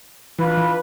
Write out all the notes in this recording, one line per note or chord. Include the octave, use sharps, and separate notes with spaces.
E3 D4 F4 B4
E3